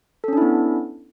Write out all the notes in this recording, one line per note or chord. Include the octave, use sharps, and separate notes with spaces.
B3 C#4 D4 E4 A4